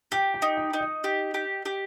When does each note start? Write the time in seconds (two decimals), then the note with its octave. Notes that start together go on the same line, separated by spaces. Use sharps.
0.12 G4 G5
0.34 G5
0.42 D#4
0.57 G5
0.73 D#4
0.81 D#5
1.04 G4
1.34 G4
1.65 G4